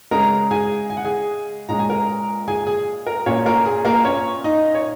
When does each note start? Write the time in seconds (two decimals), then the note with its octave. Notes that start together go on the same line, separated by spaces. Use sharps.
0.11 C#3 G#3 C#4 A#4 A#5
0.51 G#4 G#5
0.90 G#5
0.97 F#5
1.05 G#4 G#5
1.69 A#2 G#3 C#4 A#5
1.79 G#5
1.90 A#4 A#5
2.48 G#4 G#5
2.67 G#4 G#5
3.06 A#4 A#5
3.26 A#2 A#3 C#4 C#5
3.46 A#3 A#4
3.66 G#4
3.85 A#3 A#4
4.05 C#4 C#5
4.44 D#4 D#5
4.75 C#5